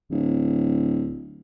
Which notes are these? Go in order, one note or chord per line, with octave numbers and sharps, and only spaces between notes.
D1